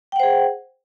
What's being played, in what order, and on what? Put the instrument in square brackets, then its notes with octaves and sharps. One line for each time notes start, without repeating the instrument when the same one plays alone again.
[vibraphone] G5
F#5
C5
G#4